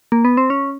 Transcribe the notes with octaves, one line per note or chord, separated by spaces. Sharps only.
A#3
B3
C4
C#4